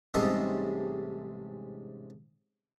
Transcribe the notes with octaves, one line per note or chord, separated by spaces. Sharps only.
A1 G#2 C3 G3 A4 D#5